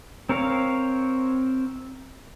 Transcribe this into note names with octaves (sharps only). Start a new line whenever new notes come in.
C4 A#4 C#5 F5